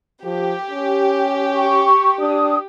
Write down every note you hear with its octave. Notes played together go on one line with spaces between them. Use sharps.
F3 G4
C#4
C#6
D4 D#6